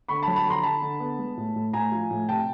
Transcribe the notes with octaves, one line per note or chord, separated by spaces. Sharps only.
D3 B5 C#6
A5 B5
F#3
A5 B5
D3 A#5 C6
D3 A5 B5
D3
B3
G#3
A2
A2
A2 G#5 A#5
F3
A2
C3 G5 A5